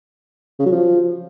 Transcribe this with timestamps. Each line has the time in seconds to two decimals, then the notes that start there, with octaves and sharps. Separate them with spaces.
0.59 C#3
0.66 F#3
0.72 F3